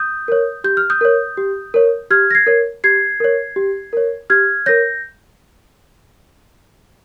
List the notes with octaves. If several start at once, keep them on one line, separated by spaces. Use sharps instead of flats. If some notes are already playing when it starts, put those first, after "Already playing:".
Already playing: D#6 G6
A#4 C#5
G4 G6
F6
D#6 G6
A#4 C#5
G4
A#4 C#5
G4 F6 G#6
A#6
G#6 C7
A#4 C#5
G4 G#6 C7
A#4 C#5
G4
A#4 C#5
G4 F6 G#6
A#4 C#5 G6 A#6